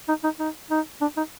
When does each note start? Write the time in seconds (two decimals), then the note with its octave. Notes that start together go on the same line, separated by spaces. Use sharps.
0.08 D#4
0.24 D#4
0.40 D#4
0.71 D#4
1.01 D4
1.17 D#4